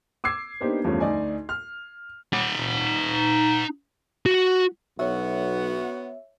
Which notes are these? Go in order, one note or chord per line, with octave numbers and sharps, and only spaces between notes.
D6 E6 G#6 C7
A#3 B3 D4 D#4 G4 C5
E2 G2 F3 A3 C#4
D2 D#4 D5 D#5 G#5
F6
D#4 F#5
F#4
B1 B3 F#4 C#5 E5